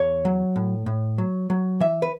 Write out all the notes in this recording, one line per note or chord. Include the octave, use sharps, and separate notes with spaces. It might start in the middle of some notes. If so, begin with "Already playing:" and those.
Already playing: E2 C#5
F#3
A2
A2
F#3
F#3
E3 E5
B4